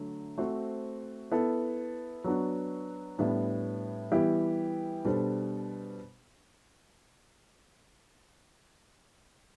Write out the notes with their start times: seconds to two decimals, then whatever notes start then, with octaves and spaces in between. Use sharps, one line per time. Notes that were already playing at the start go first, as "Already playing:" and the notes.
Already playing: D3 F#3 A3
0.38 A3 C4 F#4 C5
1.32 B3 E4 A4
2.24 F#3 B3 D4 F#4
3.18 A2 G3 B3 D4
4.12 E3 G3 B3 E4 G4
5.05 B2 G3 D4 A4 C5